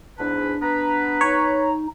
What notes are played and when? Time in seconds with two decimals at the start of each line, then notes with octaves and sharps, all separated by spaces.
0.19 E2 G#2 D4 B4
0.62 B3 B4 A#5
1.21 D#4 C#5